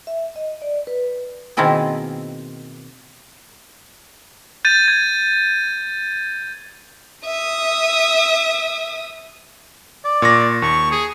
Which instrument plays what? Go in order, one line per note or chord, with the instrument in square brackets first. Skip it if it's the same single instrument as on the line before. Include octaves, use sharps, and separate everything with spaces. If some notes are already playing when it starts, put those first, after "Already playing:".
[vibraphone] E5
D#5
D5
B4
[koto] B2 D#3 A#3 C4 E4 G#4
[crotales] G6 A6 D#7
G#6
[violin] E5 D#6
[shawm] D5
[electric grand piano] A#2 C#6 A#6
[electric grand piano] D#2 [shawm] C#6
[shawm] G#4